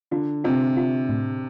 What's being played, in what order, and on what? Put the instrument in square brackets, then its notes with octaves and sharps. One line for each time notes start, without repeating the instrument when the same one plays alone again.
[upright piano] D3 [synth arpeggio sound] F4
[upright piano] C3 [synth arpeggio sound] F4
[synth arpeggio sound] F4
A2